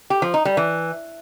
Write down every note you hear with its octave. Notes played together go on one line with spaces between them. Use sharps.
G4
F3
D#4
G3
E3